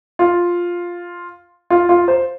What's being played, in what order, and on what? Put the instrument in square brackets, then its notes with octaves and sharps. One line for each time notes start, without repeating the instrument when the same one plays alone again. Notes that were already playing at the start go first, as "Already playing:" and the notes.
[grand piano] F4
F4
F4
C5